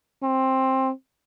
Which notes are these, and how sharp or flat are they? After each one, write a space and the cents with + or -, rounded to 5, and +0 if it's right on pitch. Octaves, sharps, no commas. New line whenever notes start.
C4 +15